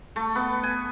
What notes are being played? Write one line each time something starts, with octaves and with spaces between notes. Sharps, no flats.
A3
B3
G#5